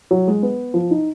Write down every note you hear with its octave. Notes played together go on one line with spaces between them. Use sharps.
F#3
G#3
B3
F3
D#4